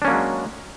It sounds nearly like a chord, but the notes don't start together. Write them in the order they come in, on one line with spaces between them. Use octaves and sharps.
D4 C#4 A#3 F#3 G#3